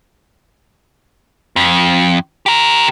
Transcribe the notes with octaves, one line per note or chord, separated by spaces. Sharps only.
F2
G4 A#4